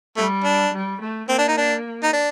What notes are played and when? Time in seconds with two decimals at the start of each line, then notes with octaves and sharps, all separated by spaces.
0.17 G3 A3
0.44 D4
0.73 G3
1.01 A3
1.28 A#3 C4
1.39 D4
1.48 D#4
1.57 D4
2.03 D#4
2.13 D4